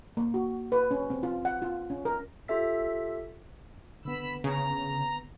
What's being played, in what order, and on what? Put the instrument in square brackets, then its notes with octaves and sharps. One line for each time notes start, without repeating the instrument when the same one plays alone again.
[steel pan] A#3
F#4
B4
C#4
C4
F4
F#5
F4
C#4
A#4
[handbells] F4 G4 A4 E5 E6 B6
[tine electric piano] D3 B3 [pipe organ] B5 E6
[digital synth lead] C#3 [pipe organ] A#5